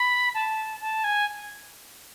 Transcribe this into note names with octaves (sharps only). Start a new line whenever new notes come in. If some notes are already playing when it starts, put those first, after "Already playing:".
Already playing: B5
A5
A5
G#5